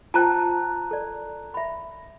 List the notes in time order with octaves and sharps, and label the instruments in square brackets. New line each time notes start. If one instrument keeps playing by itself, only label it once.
[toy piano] F4 C5 G5 [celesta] A5 A#5 F#6
[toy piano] A4 D5
E5 B5